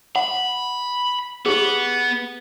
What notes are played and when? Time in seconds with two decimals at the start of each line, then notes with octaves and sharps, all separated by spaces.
0.16 F#5 B5
1.46 B3 G4 G#4